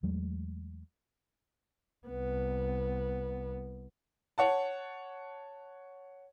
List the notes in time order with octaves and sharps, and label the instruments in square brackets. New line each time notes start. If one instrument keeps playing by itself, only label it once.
[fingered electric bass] E2 F#3 G#3 A3
[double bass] C2 B3
[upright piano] C#5 F#5 A5